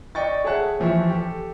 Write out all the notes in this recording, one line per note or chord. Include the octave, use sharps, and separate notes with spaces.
D5 D#5 G5 C#6 A6
G#4 C#5 E5 F#5 A5 F#6
E3 F3 G4 E5 C#6
G4 A4